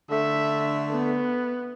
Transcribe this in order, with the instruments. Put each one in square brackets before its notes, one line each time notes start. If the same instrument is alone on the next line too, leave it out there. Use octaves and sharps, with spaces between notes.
[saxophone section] D3 A3 [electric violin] E5
[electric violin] B3